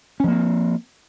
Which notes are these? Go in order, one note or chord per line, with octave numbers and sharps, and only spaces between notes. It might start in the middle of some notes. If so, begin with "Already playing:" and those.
F3 A#3 C4 C#4